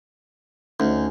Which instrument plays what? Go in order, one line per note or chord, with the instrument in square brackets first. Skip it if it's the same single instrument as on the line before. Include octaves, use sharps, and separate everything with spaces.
[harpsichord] D2 [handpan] C#4 D#4